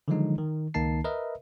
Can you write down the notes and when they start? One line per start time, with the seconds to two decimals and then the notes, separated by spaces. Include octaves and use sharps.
0.08 D3 D#3 F3 F#3 G#3 D#4
0.38 D#3
0.74 C#2 D#3 A#3 D#4 A5 C7
1.04 A#4 B4 D#5 E5